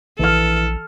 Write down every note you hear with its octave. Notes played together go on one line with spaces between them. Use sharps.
A#1 E3 A4 F6